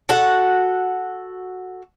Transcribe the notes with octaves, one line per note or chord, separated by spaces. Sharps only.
F#4 A4 F#5